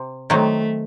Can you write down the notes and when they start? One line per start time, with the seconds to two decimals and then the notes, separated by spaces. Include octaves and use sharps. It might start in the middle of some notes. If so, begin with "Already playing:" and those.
Already playing: C3
0.30 D#3 F#3 A3 C4